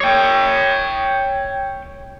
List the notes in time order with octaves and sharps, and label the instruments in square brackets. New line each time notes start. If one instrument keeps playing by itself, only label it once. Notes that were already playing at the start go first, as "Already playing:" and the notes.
[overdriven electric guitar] C#5 G5